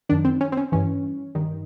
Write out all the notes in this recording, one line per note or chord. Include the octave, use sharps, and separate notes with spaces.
F#2 D#3 D4
C4
C#4
C4
C#4
G2 E3 C#4
G2 D#3